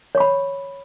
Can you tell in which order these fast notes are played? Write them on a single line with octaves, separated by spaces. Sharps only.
C#5 C#6 B5